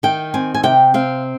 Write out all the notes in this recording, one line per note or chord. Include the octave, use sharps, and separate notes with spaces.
D#3 G5
C4 G#5
G#5
C3 G5
C4 F5